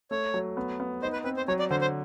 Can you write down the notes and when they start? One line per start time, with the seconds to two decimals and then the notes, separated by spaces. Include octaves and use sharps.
0.11 A3 C#5
0.34 F#3
0.57 B3
0.80 B3
1.02 D#4 C5
1.13 B4
1.24 C4 B4
1.37 C5
1.48 F#3 C#5
1.59 D5
1.71 D3 C5
1.81 C5